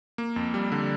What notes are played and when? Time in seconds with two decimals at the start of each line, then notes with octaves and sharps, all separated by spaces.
0.18 A#3
0.36 F2
0.54 G3
0.72 D3